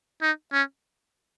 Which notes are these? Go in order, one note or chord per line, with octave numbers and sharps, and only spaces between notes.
D#4
C#4